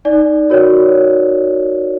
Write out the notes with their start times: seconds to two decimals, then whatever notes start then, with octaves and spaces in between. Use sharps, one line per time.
0.05 D#4 D5
0.50 F#4 A#4 C#5